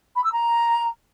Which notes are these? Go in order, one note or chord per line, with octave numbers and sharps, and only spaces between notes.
B5
E6
A#5